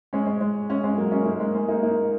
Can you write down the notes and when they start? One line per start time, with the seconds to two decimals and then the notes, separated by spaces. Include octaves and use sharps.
0.13 G#3 C#4
0.27 G#3
0.41 G#3
0.70 G#3 C#4
0.84 G#3 C#4
0.98 F#3 A#3
1.12 G#3 C#4
1.26 A#3 D#4
1.40 G#3 C#4
1.55 G#3
1.68 A#3 D#4
1.83 A#3 D#4